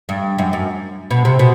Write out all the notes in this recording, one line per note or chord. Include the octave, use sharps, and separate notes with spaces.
G2
F#2
F#2
B2
C3
B2